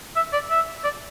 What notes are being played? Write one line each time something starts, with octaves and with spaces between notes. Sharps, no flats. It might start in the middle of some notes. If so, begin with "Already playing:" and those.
E5
D5
E5
D5